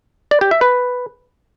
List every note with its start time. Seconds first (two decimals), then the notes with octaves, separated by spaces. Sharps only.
0.31 D5
0.41 G4
0.51 E5
0.61 B4